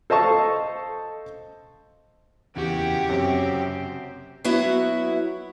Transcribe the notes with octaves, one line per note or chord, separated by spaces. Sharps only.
A4 C5 D#5 F5 A5 C#6
E2 C#3 F#4 G4 G5
F#2 C3 C4
F#3 B3 E4 F#4